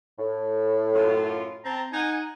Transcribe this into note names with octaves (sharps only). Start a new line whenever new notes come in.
A2
F#2 F4
C4 A5 A#5
D#4 F#5 G#5